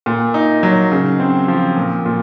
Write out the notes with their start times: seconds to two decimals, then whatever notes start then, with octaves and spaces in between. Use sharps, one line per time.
0.06 A#2
0.34 D#4
0.63 F#3
0.92 C#3
1.20 C4
1.48 F3
1.77 A#2
2.06 A#2